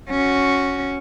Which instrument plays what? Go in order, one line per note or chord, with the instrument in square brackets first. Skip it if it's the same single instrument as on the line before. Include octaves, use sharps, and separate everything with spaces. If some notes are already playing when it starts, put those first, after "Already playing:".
[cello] C#4 F#4